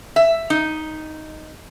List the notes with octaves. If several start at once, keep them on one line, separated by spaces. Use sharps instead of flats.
E5
D#4